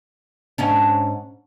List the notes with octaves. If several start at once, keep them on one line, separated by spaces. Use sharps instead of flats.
G#2 C#4 D4